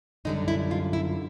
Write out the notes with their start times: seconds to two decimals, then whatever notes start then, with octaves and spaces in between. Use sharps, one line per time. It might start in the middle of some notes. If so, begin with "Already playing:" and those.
0.25 F#2 D3 G3 D#4
0.48 E4
0.71 F4
0.93 E4